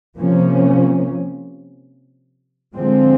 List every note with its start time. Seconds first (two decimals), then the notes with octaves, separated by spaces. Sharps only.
0.18 C3 F3 A#3 C#4
2.74 D3 F3 G#3 C4